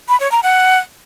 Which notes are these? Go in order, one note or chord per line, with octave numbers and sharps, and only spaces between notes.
B5
C#5
A#5
F#5